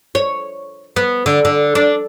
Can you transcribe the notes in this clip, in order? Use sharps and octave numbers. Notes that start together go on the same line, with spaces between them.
C#5
B3
D3
D3
D4